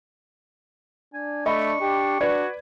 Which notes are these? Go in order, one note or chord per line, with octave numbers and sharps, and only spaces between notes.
D4 G#5
A3 D#5 B5 C#6
D4 G4
D4 F#4 B4 D5 G#6